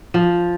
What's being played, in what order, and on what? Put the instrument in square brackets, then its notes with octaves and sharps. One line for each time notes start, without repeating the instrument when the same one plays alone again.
[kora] F3